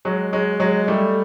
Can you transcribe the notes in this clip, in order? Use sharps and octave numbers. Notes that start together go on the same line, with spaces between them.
F#3 G#3
F#3 G#3
F#3 G#3
G3 A3